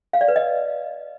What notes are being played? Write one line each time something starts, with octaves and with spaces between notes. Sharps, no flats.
F5
D5
B4
D#5